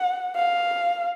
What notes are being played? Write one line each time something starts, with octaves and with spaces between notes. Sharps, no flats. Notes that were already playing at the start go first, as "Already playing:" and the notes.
Already playing: F#5
F5